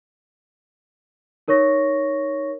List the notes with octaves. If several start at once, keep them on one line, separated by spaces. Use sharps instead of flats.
D#4 A#4 C#5 C#6 A#6